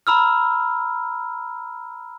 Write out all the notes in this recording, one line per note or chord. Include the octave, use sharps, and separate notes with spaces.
A#5 B5 E6 F6